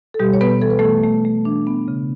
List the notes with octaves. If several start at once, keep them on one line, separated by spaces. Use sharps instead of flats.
A4
B2 G3 G4
C#5
B2 B3 B4
E3 A4
B4
E3 A3 A4
A3
A3
E3 D4
B3
C#3